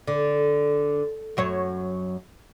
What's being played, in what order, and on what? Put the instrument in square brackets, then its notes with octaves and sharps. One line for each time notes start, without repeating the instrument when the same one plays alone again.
[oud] D3
F#2 F#3 C#5